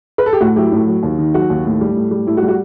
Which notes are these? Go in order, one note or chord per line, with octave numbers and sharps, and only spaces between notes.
B4
A4
G4
A2 F#4
F#3 E4 G4
A2
F#3
D#2
D#3
F#3 F#4
D#2
A2
G3
A2
G3
A2 E4
F#4
G3
F#4